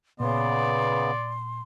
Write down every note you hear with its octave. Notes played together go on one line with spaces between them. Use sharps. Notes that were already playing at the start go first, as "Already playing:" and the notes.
A#2 C#3 B3 D5 C6